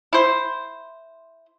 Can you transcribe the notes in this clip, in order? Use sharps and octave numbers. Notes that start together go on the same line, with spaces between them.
E4 C5